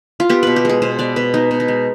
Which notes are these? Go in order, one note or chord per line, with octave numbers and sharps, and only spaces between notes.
F4
B3 G4
B2 B4
G4
G#3 G#4
B2 C5
B3 D5
B2 B4
B3 D#4
B2
D#4
G#3